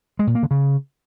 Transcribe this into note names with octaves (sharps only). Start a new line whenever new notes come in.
G#3
A#2
A#3
D3
C#3